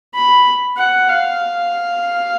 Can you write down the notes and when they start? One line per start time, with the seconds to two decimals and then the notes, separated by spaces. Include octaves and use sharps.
0.14 B5
0.77 F#5
1.09 F5